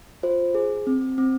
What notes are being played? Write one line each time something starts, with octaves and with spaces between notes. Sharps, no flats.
F4 C5
G#4
C4
C4